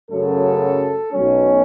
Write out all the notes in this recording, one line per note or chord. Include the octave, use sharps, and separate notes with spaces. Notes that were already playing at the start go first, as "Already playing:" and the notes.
F#2 C#3 F#3 A3 A4
B1 B2 F#3 A3 C#4